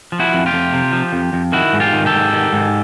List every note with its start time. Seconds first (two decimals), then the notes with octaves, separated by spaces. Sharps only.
0.12 F3
0.20 E4 F#4
0.33 F2
0.46 F4 G4
0.53 F2
0.73 C3
0.92 F3
1.13 F2
1.33 F2
1.52 D#3 E4 F#4
1.73 G#2
1.80 F4 G4
1.93 D#3
2.06 G4 A4
2.13 G#2
2.33 D#3
2.53 G#2